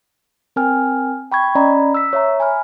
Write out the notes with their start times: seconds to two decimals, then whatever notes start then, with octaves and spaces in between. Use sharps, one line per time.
0.56 C4 A#4 G5 G#5 F6
1.32 G5 B5 C#6 G#6
1.55 C#4 D5 D#5 A#5 B5
1.94 E6 B6
2.13 C#5 E5 A#5
2.40 G#5 B5 F6